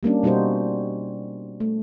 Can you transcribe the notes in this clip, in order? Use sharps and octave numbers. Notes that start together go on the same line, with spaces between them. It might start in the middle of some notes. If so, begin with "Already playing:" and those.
G3 A#3 C#4 D4
B2 G3 D#4 F#4 C5
A3